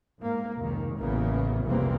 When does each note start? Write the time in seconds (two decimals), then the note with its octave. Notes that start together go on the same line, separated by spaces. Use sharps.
0.20 G#2 A#3
0.59 F1 C#2 D#3
0.97 A1 C#3 E3 A#3 B3
1.66 F1 C2 C#3 E3 A#3 C4